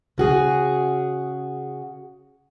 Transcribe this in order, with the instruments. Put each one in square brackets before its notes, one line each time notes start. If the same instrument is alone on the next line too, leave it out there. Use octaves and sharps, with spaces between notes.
[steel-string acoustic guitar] C#3 F#4 G#4